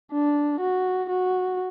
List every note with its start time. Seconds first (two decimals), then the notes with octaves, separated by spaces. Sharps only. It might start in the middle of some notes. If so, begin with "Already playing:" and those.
0.12 D4
0.61 F#4
1.10 F#4